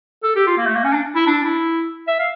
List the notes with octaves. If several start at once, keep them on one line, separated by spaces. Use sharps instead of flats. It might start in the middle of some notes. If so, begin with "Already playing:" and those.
A4
G4
F4
A#3
A3
A#3
C#4
D4
E4
D4
E4
E5
F5